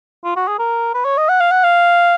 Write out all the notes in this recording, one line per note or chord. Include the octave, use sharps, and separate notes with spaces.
F4
F#4
G#4
A#4
B4
C#5
D#5
F#5
F5
F#5
F5